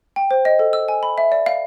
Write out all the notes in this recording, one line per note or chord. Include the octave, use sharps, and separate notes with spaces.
G5
C5
D#5
A4
E6
G#5
B5
E5
D5
F5